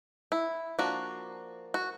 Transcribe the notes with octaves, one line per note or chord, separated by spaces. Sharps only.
E4
F3 A#3 D4 F#4
F#4